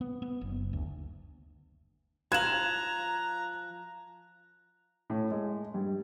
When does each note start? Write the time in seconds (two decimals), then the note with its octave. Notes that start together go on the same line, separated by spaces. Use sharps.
0.01 B3
0.22 B3
0.41 F#1
0.73 D2
2.32 F3 F5 A#5 F#6 G#6 E7 F#7
5.10 A2
5.31 G#3
5.74 G2